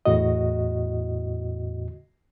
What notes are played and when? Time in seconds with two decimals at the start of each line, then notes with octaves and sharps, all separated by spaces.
0.05 E2 A2 F#4 D#5